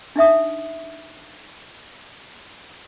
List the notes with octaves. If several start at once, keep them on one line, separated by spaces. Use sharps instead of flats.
D4 D#4 E5 D#6